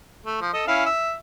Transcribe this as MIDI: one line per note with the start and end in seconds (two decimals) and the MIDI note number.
0.26 0.38 57
0.41 0.52 53
0.53 0.63 69
0.53 0.63 75
0.67 0.85 61
0.67 0.85 64
0.67 0.85 77
0.86 1.14 76